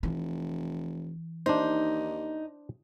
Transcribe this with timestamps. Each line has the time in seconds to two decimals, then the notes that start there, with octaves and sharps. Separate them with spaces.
0.03 F1 E3
1.46 D#2 D4 D#4 C5